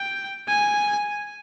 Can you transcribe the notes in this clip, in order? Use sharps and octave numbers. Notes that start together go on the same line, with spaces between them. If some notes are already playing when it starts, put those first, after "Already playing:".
Already playing: G5
G#5